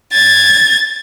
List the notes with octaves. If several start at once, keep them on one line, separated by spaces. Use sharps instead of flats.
G#6 A6